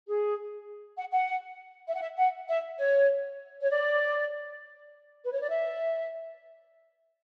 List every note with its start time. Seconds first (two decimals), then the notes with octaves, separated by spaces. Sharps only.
0.07 G#4
0.97 F#5
1.13 F#5
1.88 E5
1.95 F#5
2.02 E5
2.18 F#5
2.49 E5
2.78 C#5
3.62 C#5
3.70 D5
5.24 B4
5.32 C#5
5.42 D5
5.50 E5